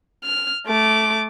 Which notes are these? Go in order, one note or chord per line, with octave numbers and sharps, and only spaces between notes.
F6
A3 D6